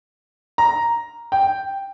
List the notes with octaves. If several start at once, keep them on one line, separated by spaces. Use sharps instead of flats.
A#5
G5